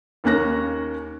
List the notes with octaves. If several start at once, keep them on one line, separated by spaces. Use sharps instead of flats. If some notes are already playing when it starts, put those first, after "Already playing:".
D#2 A#3 C#4 F#6 A#6